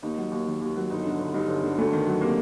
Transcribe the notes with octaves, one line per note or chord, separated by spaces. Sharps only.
D#2 D#4
F#3
D#2
D#3
D#2
F#3
G1 D#4
D3
G1
G2 D#4
G1
D3
D2 A3
D#3
F#3
C3 A#3